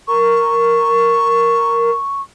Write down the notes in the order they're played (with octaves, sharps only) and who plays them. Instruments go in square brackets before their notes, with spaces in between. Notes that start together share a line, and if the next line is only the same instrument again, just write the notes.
[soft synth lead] A#4 [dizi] C#6